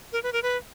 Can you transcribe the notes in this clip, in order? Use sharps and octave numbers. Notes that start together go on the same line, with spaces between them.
A#4
B4
A#4
B4